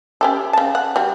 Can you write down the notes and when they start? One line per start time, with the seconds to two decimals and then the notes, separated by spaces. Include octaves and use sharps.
0.21 C#4 G4 A4
0.53 C#3 A5
0.75 F#5
0.96 G3 F#4